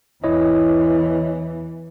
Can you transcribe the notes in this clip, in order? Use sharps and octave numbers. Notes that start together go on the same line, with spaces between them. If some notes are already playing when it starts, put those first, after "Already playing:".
E2 E3 E4 C#5 D#5